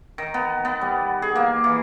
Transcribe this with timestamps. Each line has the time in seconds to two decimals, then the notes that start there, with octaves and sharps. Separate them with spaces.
0.18 D#3
0.34 B3
0.65 B3
0.81 G3
1.22 G#4
1.36 A#3
1.64 E3